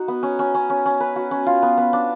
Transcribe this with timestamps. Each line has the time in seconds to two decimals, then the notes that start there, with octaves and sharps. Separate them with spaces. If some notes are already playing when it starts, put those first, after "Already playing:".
Already playing: D#4 F#4
0.08 B3
0.23 C#4
0.39 C#4
0.54 C#4
0.70 C#4
0.86 C#4
1.00 B4
1.16 F#4
1.31 C#4
1.46 F4
1.62 B3
1.78 B3
1.93 D4